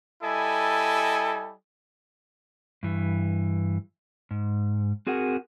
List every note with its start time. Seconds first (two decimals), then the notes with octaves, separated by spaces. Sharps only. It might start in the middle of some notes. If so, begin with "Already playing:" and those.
0.22 G3 E4 A4 D#5 G#5
2.83 G2 E3
4.31 G#2
5.07 C4 F#4 G#4 A#4 F#5